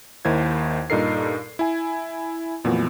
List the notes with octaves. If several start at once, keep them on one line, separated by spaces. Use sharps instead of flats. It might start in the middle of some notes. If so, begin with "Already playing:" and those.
D#2 D#3 E4 C5 G#6
G2 A#2 D#4 A4 A#4 C7
E4 G#5
F2 A#2 E3 F#3 A3 B3